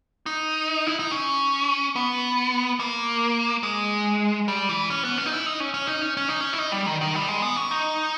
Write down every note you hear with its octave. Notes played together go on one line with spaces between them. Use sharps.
D#4
E4
D#4
C#4
B3
A#3
G#3
G3
E3
C#4
B3
C#4
D#4
E4
D#4
C#4
C#4
D#4
C#4
C#4
D#4
C#4
E4
D#4
G3
D#3
D#3
G3
G#3
B3
C#4
D#4